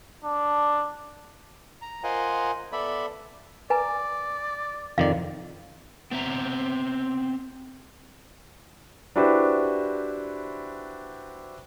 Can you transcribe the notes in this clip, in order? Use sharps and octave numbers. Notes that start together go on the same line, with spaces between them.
D4
A#5
F4 A#4 C5 D#5 F#5 G#5
B3 A4 D5 E5 B5
B4 D5 G#5 A#5
F2 D#3 D5 F5
B3 C4 E5 A#5
D4 E4 F#4 G4 B4 C5